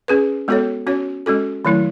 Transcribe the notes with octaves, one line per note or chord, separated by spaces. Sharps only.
C#4 G#4 B4
G#3 B3 F#4 A4 C#5
C#4 F#4 C#5
G#3 C#4 F#4 A4
D#3 F#3 A3 E4